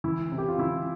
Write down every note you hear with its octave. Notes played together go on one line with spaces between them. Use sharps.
E3 E4
C3
G4
F4
E3 E4